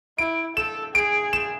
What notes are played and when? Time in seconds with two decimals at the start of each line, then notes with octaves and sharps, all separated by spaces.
0.18 E4 D7
0.56 A4 E7
0.94 G#4 D7
1.33 E7